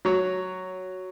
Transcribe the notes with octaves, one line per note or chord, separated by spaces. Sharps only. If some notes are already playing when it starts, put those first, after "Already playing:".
F#3 C#5